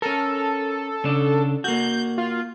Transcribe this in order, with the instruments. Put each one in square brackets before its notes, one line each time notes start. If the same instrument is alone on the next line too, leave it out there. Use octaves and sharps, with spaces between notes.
[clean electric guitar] C#4 A#4 [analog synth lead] A4
[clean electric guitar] C#3 D4
[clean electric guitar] A#3 F#4 [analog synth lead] G6
[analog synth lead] F4